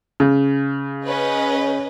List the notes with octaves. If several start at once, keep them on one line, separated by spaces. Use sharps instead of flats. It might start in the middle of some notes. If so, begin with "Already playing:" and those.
C#3
C#4 B4 D#5